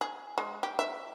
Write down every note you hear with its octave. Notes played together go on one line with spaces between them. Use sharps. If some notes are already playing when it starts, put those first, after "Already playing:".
G#4
G#3
G4
E5